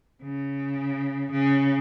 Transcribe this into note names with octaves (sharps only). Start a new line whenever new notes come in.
C#3
C#3